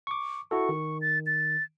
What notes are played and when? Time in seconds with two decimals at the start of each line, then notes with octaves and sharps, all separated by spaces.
0.07 C#6 D6
0.51 E4 F#4 A4 C#6
0.69 D#3
1.01 A6
1.26 A6